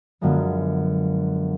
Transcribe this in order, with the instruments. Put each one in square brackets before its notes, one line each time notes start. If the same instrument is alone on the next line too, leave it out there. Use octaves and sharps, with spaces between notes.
[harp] F#2 D3 F3 G#3 B3